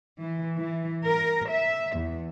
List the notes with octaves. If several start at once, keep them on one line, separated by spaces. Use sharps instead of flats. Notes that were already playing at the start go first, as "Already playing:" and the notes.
E3
E3
A#4
E5
E2